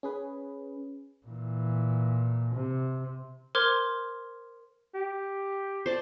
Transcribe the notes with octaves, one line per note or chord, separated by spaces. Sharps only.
C#4 G#4 B4
A#2 E3
C3
A#4 C5 C6 D6 F6 G#6
G4
C5 D5 A5